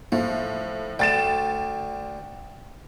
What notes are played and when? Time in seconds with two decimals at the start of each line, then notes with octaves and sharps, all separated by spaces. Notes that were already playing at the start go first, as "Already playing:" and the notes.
0.12 A2 F3
0.99 D2 D3 G5 A6 E7